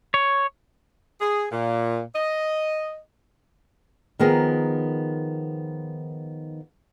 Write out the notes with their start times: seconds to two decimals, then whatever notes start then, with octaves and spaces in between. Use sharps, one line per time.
0.14 C#5
1.19 G#4
1.51 A#2
2.15 D#5
4.19 D#3 F3 B3 G#4 A#4